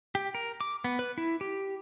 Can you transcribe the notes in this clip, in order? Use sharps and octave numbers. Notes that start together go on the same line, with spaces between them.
G4
A#4
D6
B3
B4
E4
G4